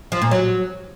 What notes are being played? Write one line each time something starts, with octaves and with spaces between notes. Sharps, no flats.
F3
A#2
F#3